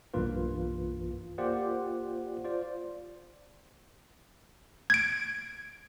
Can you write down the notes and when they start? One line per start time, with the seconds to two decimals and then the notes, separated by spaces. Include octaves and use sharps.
0.14 B1 G2 E3 A#3 F4 B4
1.38 A#3 F4 G4 C5 D5 F#5
2.44 F4 C5 D5
4.90 G#6 D7